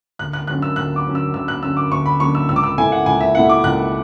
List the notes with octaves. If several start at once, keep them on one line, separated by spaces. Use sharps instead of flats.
D2 F#6
F#6
D3 F#3 C#4 F#6
E6
D2 F#6
D6
D3 F#3 C#4
E6
D2 E6
F#6
D3 F#3 C#4 E6
D6
D2 C#6
B5
D3 F#3 C#4 C#6
E6
C#2 E6
D6
E6
B2 A3 E4 G#5
F#5
C#2 G#5
E5
B2 A3 E4 F#5
D6
C#2 F#6